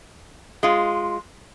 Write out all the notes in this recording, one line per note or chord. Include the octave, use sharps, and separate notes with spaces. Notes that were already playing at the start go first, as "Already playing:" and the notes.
G#3 F4